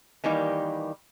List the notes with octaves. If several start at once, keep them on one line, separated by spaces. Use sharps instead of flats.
D#3 E3 G3 A#3 D#4 G4